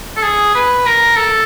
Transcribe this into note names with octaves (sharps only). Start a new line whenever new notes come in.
A4
G#4
B4
A#4
A4